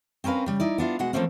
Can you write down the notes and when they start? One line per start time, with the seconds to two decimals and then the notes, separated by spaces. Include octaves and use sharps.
0.24 C4 C#4 A#4 B4 F5
0.46 C#3 G3
0.60 D#4 E4 D5
0.78 B3 D4 F4
0.99 B2 G#3 F#4 F#5
1.13 E3 F3 A3 A#3 C4 C#4